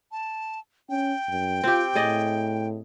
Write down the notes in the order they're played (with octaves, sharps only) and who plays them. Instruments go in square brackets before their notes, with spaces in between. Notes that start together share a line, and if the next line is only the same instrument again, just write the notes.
[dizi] A5
[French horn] C#4 [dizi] G5
[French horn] F#2
[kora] C4 G4 [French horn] F4
[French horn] A2 [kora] G#4 D5 D#5